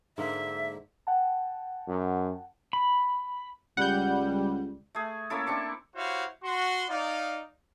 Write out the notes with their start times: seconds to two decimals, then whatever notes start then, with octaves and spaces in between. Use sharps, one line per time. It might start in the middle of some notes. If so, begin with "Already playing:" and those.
0.18 G#2 D3 A#3 E5
1.07 F#5 G5 A5
1.88 F#2
2.73 B5
3.77 C#2 G3 F#5 G6
4.95 A3 G#4
5.30 A#3 C#4 E4 A4
5.47 C4 D4 C#6 D6
5.95 E4 F#4 G4 C5 C#5 F5
6.43 F#4 C6
6.89 D#4 D5 F5